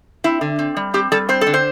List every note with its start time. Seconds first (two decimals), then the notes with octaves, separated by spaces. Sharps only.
0.24 C4 E4
0.41 D3
0.59 C4
0.77 G3
0.94 C4 G4
1.12 G3 A4
1.29 C4 C5
1.41 A4
1.46 D3
1.54 C5